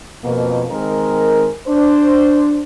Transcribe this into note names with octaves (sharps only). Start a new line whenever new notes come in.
F2 B2 A#3
D#3 G#3 C4 A#4
D4 C5